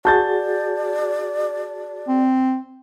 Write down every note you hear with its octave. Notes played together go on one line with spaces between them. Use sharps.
F#4 G#4 D5 A5 G6 A6
C4